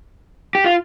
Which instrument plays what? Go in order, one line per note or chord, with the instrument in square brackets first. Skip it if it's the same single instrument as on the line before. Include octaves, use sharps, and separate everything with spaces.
[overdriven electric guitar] G4
F4